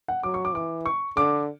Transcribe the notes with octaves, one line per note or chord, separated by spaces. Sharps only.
F#5
F#3 D6
C#6
D6
E3 D6
C#6
D3 D6